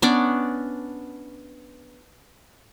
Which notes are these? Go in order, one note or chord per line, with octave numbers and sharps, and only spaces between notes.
B3 C#4 D4 D5